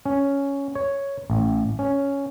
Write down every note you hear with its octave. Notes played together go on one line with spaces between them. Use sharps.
C#4
C#5
A1
C#4